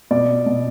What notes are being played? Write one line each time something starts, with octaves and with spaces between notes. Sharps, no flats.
B2 D5
B2